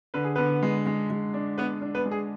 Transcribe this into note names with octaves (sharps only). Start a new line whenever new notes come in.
D3 B4
G#4
D3 B3 B4
G#3
G#3
G#3
D4
B3 D4 B4
D4
B3 B4
G#3
G#4